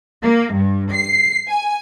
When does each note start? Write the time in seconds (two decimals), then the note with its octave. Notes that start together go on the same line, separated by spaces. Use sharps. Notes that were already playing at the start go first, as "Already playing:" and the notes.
0.23 A#3
0.54 G2
0.93 C7
1.48 G#5